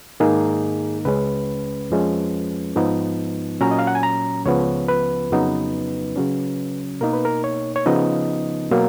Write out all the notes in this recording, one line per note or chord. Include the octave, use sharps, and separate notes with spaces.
G#2 D#3 A#3 D#4 G#4
C#2 C#3 G#3 C#4 B4
F2 F3 G#3 C#4
G#2 F3 B3 D#4
A#2 F#3 C#4 A#5
D#5
F5
F#5
G#5
A#5
C#2 C#3 F3 B3 C#5
B4
F2 C#3 F#3 B3 D#4
C#3 F#3 C#4
B2 A#3 D#4 A#4
B4
A#4
C#5
C#5
C#3 F3 B3 D#4 D#5
B2 F#3 A#3